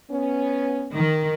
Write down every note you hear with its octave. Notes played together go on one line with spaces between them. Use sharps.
B3 C#4
D#3